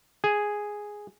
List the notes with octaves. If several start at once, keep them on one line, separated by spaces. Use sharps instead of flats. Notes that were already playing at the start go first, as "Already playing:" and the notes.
G#4